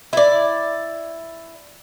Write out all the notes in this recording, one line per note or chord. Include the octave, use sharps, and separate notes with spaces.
E4 D5